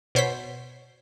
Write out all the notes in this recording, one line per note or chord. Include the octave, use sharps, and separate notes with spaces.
B2 C5 C#5 B6